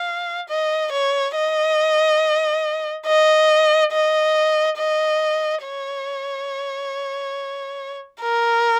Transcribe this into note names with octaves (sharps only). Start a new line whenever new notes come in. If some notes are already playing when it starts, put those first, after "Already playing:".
Already playing: F5
D#5
C#5
D#5
D#5
D#5
D#5
C#5
A#4